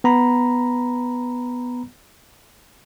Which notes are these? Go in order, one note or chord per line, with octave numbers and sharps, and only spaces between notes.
B3 A#5 B5